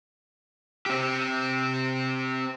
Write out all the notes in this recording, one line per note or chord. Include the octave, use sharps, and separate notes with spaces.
C4 G4